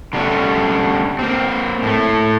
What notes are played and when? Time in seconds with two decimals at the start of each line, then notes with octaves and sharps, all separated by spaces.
0.13 D3 G3 A3 C#4
1.19 A#3 C4
1.82 A2 A3